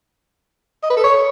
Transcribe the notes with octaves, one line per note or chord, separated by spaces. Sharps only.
D#5
B4
A4
C#5